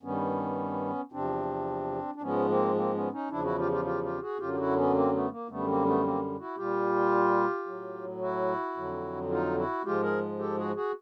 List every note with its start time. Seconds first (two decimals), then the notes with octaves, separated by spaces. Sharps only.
0.03 G2 D#3 G3 B3 C#4
1.12 E2 C3 F3 C4 D4
2.16 D4
2.21 G#2 F3 G#3 B3 C#4
2.48 A#3 C4
2.76 A#3 C4
2.94 B3 C#4
3.12 C#4 D#4
3.31 E2 C#3 F3 D4 E4
3.44 E4 F#4
3.58 F4 G4
3.71 F4 G4
3.85 F4 G4
4.04 F4 G4
4.21 F#4 G#4
4.39 F#2 D3 F#3 F4 G4
4.53 G4
4.57 E4 F#4
4.76 B3 C#4
4.94 A#3 C4
5.12 A3 B3
5.31 A#3
5.49 F#2 D3 G3 A3 B3
5.67 A#3 C4
5.85 A3 B3
6.03 A#3 C4
6.39 E4 F#4
6.57 A#2 G3 F4 G4
7.66 A2 F#3
8.21 E4 F#4
8.77 F2 D3 F#3
9.31 D#4 F4
9.57 E4 F#4
9.85 G#2 F3 G#3 F4 G4
10.03 G#4 A#4
10.39 G4 A4
10.57 F#4 G#4
10.75 F#4 G#4